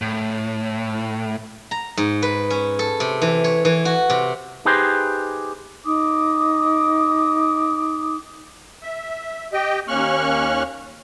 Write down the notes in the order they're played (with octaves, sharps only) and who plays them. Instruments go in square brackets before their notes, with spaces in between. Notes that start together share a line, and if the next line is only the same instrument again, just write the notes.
[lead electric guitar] A2
[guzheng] A#5
G#2
B4
C#4
A4
C3
E3
C#5
E3
F#4
C3
[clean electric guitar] D#4 G4 G#4 B4 C5
[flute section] D#4 D6 D#6
[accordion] E5
G4 D#5 G5
D#2 A#3 C#4 C#6 F6 F#6